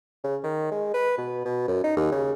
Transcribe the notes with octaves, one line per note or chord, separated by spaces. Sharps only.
C#3
D#3
G#3
B4
B2
B2
F#2
D#4
D#2
C#3